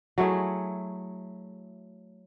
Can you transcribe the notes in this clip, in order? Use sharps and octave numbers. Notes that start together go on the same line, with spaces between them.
F#3 A3 E4 G#4